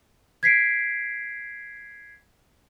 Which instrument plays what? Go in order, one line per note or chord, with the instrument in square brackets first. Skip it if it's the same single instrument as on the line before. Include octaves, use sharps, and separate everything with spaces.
[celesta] G#6 B6 C7 D7